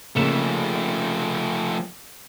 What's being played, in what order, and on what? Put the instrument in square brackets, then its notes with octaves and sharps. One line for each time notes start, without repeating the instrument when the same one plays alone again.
[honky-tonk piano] C#3 A#3 E7 [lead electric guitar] F3 A3